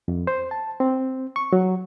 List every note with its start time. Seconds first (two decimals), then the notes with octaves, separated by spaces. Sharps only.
0.08 F2
0.27 C5
0.51 A5
0.80 C4
1.36 C#6
1.53 F#3